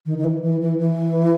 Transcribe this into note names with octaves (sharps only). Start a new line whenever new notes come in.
D#3
D#3
E3
E3
E3
E3